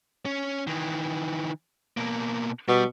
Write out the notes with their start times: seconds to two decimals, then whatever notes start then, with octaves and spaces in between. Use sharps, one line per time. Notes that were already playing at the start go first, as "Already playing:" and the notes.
0.25 C#4
0.67 D#3 E3
1.97 B2 A#3
2.68 B2 G3